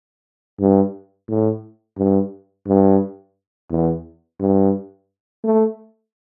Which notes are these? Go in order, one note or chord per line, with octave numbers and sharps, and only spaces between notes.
G2
A2
G2
G2
E2
G2
A3